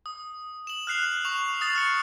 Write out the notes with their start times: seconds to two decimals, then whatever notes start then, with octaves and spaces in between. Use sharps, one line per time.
0.06 D#6
0.67 E7 F#7
0.87 F6 F#6 C7 F7
1.25 C#6 F7
1.61 D#6 A6 C7
1.75 F6 C#7